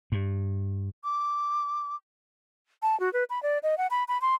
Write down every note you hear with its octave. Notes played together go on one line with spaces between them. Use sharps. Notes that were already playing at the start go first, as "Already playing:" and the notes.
G2
D6
A5
F#4
B4
B5
D5
D#5
F#5
B5
B5
C6